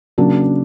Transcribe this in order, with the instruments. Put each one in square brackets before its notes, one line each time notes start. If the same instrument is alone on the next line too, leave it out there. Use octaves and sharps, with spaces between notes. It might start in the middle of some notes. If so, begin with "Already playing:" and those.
[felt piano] C#3 F#3 A#3 D4